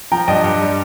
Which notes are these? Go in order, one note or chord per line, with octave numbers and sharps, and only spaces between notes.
F3 G5 A#5
G2 D#5 G5
G2
G3